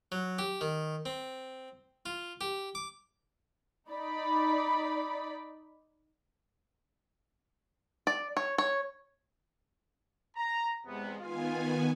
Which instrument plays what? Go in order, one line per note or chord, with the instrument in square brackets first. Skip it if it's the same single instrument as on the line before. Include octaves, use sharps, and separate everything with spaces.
[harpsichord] F#3
G4
D#3
C4
F4
G4
D6
[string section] D#4 D5 B5
[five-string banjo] D5
C#5
C#5
[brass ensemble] A#5
[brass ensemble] E2 C3 B3 [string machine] G#3
[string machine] D#3 B3 G#5 [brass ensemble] F4